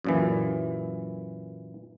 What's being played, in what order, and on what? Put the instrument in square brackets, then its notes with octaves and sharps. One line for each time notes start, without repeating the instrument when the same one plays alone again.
[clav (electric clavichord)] F#2 A#2 E3